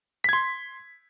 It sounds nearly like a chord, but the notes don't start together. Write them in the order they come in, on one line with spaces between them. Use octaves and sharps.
B6 G#6 C6